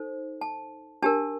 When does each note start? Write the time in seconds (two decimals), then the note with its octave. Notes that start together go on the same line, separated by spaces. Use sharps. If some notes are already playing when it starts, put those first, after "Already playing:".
Already playing: D#4 A4 C5
0.41 A5
1.02 D4 G4 A#4 A5